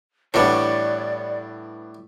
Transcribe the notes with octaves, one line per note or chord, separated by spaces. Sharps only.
A2 E3 G3 B3 D4 C#5 D5